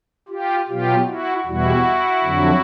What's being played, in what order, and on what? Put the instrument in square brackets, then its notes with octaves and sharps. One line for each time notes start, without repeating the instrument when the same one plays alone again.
[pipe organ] F4 G4
B2 F#3 F4 G4
E4 F#4
E2 B2 G3 E4 F#4
F2 D3 F#3